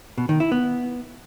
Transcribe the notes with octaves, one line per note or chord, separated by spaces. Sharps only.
B2
D#3
E4
B3